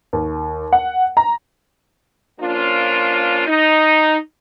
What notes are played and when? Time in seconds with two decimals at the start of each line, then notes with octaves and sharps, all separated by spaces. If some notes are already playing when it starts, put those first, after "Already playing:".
0.13 D#2
0.73 F#5
1.17 A#5
2.40 F3 A#3 C#4 D4 F4
3.47 D#4